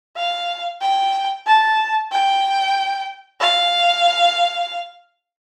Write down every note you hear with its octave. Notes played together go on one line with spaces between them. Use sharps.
F5
G5
A5
G5
F5